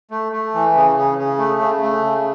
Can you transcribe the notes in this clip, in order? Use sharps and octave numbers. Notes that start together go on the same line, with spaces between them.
A3
A3
E3
C#3
C#3
C#3
A3
C#3
A3
C#3